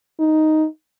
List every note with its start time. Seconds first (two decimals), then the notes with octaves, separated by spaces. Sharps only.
0.20 D#4